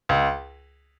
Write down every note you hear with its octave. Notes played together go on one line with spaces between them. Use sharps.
C#2